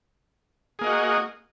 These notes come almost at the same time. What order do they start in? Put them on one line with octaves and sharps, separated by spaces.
G#4 A#3 D#5 F#4